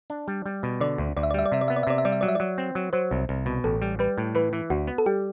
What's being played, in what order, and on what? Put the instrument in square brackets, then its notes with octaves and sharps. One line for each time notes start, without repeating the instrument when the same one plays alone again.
[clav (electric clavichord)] D4
G3
G3
B2
[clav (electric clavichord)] D3 [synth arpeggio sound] D5
[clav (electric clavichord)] D2
[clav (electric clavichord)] D2 [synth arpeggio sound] D5
[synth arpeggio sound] E5
D5
[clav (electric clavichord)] G3 [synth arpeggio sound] E5
[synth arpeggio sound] D5
[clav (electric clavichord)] C3 [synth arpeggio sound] E5
[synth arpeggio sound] D5
[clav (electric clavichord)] B3 [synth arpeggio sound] E5
[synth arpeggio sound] D5
E5
[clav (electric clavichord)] C3 [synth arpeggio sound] D5
[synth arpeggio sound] E5
[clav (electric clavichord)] G3 [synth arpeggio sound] D5
[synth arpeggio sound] E5
[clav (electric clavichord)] F#3 [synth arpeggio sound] D5
[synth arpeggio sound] E5
[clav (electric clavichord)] F#3 [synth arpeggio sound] D5
[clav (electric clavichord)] C4
F#3
[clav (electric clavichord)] F#3 [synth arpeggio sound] C5
[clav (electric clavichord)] C2
C2
B2
[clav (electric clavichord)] A1 [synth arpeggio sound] A4
[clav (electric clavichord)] G3
[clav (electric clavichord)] G3 [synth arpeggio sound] B4
[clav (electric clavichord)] A2
[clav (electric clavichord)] E3 [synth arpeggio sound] B4
[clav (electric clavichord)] E3
[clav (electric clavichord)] D2 [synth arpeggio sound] F#4
[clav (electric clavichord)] B3
[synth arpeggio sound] A4
[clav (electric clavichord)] G3 [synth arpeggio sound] G4